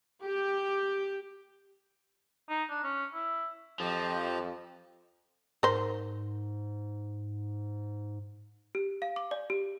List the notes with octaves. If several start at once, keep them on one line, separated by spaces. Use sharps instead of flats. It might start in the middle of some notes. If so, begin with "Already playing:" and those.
G4
D#4
D4
C#4
E4
F2 F3 G4 D#5
G#2 A#4 C5
G4
F5
D6
D5
G4